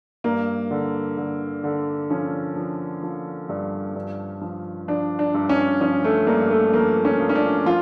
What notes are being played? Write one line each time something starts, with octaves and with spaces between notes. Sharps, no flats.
G2 A#3
D3
D3
D3
F3 C#4
F3
F3
G2
G2
F3
F3 D4
D4
G2
C#4
F3 C#4
A3
G2 A#3
A3
F3 A#3
C#4
F3
C#4
D4
F3 F4